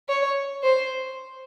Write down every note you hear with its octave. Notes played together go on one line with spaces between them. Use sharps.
C#5
C5